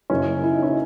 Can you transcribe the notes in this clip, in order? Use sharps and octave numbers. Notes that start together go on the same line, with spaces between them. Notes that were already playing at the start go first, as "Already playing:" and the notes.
F#1 F#2 C#3 C#4 E4
E4
D#4
C#4 E4